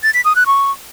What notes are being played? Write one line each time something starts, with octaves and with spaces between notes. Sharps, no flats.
A6
B6
D#6
F#6
C#6